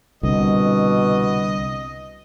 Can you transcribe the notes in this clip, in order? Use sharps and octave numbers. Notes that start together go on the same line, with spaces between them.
C2 B2 D3 D#5